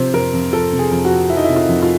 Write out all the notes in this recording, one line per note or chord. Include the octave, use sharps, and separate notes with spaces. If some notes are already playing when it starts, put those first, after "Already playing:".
Already playing: C3 F3 C5
F2 A#4
F2
F3 A4
C3
G#4
F2
F#4
F2
F3 E4
D#4
E4
C3
F4
F2
F4